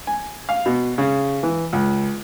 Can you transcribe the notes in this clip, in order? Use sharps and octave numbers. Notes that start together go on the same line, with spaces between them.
G#5
F5
B2
C#3
E3
C#2